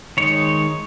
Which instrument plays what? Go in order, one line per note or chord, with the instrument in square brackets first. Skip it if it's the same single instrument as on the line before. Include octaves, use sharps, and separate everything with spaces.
[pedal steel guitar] D#3 G#3 D#4 C#5